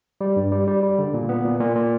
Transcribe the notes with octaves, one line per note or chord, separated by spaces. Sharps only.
G3
G2
G3
G3
G3
D3
A#2
B3
A#2
A#2
A#2